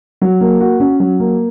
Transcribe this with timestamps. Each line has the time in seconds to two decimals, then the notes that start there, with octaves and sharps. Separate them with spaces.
0.22 F#3
0.41 A#3
0.61 F#4
0.80 C#4
1.00 F#3
1.20 A#3